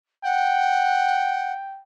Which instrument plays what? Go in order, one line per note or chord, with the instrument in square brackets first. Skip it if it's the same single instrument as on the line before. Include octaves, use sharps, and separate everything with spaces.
[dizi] F#5 [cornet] G5